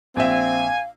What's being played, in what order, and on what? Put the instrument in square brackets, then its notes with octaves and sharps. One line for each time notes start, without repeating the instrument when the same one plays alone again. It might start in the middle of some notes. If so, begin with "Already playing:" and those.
[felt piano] A#1 E5 [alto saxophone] C4 [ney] F5 [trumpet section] G#5